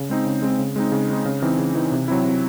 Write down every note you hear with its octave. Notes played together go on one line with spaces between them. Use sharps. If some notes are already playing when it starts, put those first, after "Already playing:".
Already playing: C#3
G#3 C4 D#4
C#3
G#3 C4 D#4
C#3
G#3 C4 D#4
C#3
G#3 C4 D#4
C#3
E3 C4 D#4
C#3
E3 C4 D#4
C3
F#3 C4 E4
C3